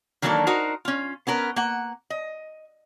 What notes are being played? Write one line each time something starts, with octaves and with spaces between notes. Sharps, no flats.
D#3 E3 F#3 A#3 D4 A4
D#4 F#4 A#4 C5
C#4 F4
B3 C#4 A#4 B4
A#3 F#5
D#5